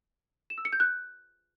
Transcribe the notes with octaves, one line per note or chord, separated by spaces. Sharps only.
E7
E6
C#7
G6
F#6